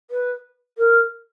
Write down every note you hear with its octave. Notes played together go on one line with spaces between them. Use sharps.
B4
A#4